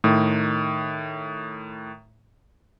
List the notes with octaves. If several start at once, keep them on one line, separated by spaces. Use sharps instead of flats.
A2 D#3